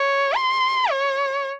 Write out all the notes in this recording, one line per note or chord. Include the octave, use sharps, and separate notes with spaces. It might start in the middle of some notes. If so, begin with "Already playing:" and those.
Already playing: C#5
C6
C#5